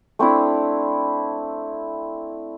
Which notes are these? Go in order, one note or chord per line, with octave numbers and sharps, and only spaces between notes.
A3 C4 D4 E4